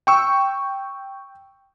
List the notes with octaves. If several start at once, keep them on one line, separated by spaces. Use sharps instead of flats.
G5 C#6 E6